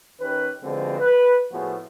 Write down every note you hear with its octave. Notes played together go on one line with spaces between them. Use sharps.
D#3 C#4 G4 B4
B2 D3 F3 G#3 C4
B4
A2 F3 B3 F#4 G#4